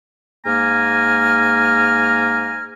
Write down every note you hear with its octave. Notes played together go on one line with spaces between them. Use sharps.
G#2 A#3 G#5 A#5 F6